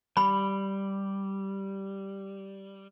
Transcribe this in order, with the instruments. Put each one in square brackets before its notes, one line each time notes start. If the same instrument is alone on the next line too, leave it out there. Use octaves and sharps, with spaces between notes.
[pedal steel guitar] G3 [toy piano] B5